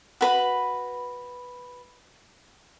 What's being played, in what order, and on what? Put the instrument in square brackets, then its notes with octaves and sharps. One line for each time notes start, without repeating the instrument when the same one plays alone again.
[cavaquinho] F#4 B4 B5